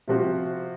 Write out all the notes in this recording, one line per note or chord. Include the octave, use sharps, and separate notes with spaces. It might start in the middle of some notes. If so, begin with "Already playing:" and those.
C3 F3 C4 F#4